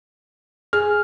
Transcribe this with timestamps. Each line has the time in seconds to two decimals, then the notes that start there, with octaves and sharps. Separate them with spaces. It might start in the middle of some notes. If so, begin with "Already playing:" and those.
0.73 G#4 F6